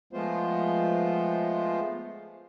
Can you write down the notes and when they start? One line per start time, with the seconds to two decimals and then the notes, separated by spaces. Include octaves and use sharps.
0.13 F3 G#3 A3 B3 F4 C5